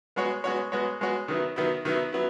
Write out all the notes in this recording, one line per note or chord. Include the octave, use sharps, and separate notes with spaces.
G#3 B3 F#4 C#5
G#3 B3 F#4 C#5
G#3 B3 F#4 C#5
G#3 B3 F#4 C#5
D#3 F#3 B3 E4
D#3 F#3 B3 E4
D#3 F#3 B3 E4
F#3 B3 E4